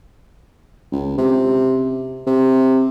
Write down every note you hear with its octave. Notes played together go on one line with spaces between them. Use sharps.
C#2
C3
C3